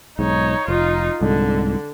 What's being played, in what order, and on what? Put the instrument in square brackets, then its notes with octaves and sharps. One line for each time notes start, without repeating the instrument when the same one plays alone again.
[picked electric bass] B1 G#2 [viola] D#4 C#5
[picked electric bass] F1 [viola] D#4 F4
[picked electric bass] C2 G#2 [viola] D3